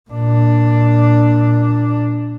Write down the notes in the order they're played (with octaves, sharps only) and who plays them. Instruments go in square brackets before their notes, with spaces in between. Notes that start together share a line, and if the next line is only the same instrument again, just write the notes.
[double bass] A#2 D4